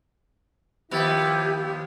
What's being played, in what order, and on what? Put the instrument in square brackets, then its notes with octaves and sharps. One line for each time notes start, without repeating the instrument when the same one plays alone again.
[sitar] D#2 F3 B3 [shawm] E4 [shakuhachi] G4